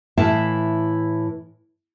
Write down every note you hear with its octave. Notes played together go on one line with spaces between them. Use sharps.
A2 E3 E4 E5 F5 A5